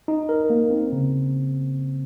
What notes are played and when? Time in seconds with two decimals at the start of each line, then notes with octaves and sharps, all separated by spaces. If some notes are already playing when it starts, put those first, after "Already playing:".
0.08 D#4
0.29 A#4
0.50 A#3
0.70 C4
0.92 C#3